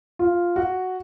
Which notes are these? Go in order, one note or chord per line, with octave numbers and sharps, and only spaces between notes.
F4
F#4